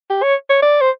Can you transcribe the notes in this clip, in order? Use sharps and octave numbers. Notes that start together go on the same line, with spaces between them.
G4
C#5
C#5
D5
C5